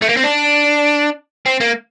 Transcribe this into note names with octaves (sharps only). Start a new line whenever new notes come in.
A3
A#3
C4
D4
C4
A#3